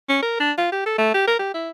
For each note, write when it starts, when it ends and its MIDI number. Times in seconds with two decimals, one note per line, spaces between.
0.09 0.18 61
0.22 0.36 70
0.40 0.52 62
0.58 0.68 65
0.72 0.81 67
0.86 0.96 69
0.98 1.12 57
1.14 1.26 67
1.27 1.34 70
1.39 1.50 67
1.54 1.70 64